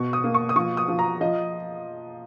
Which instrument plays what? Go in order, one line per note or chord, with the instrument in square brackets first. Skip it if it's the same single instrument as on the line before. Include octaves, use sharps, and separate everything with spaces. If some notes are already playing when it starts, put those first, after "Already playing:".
Already playing: [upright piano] B2 C#6
D#6
A#3
C#6
D#6
F3 C#6
D#6
F3
A#5
F3 D#5